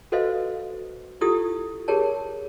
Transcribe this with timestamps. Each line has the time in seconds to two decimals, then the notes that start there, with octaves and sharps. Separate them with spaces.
0.12 F#4 A4 B4 C5 D#5 F5
1.21 E4 F4 G4 A4 D#6
1.88 G4 G#4 A#4 C#5 A5